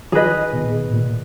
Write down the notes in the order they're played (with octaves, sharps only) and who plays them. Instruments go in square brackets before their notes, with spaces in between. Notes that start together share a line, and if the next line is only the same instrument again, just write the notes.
[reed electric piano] D#3 [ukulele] G#4 B4 D#5
[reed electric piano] B2
A#2
A2
A#2